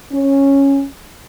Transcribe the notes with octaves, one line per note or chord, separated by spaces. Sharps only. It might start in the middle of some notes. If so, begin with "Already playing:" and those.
C#4